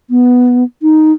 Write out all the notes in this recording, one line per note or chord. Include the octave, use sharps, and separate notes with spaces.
B3
D#4